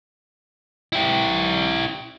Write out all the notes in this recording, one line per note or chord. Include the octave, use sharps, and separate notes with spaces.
E4 G4